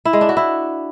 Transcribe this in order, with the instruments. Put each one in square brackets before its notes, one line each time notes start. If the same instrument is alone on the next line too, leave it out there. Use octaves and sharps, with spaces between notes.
[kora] E4
G#3
D4
F#4
E4